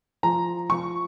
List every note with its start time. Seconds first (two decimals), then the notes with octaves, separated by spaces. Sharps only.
0.23 F3 A#5
0.69 F3 C#6